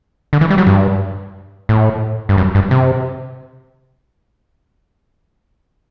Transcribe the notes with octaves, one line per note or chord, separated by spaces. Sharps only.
D3
E3
G3
F#3
G2
A2
G2
F#2
G2
C3